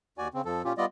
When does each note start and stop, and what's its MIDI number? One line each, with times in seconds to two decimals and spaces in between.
0.18 0.28 39
0.18 0.28 66
0.18 0.28 74
0.18 0.28 80
0.34 0.42 49
0.34 0.42 60
0.45 0.62 41
0.45 0.62 53
0.45 0.62 69
0.64 0.73 46
0.64 0.73 61
0.64 0.73 65
0.64 0.73 67
0.78 0.86 55
0.78 0.86 59
0.78 0.86 65
0.78 0.86 74
0.78 0.86 75